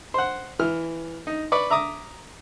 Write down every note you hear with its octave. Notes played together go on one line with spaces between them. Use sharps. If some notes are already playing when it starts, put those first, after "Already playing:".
C5 F#5
E3 F6
D#4
B4 D5 C#6
E5 A#5 D6 D#6